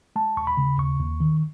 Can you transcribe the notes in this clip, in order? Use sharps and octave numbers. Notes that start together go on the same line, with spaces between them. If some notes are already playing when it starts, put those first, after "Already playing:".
G#3 A5
D#2 C#6
B5
C#3
D#2 C#6
D#2
D#3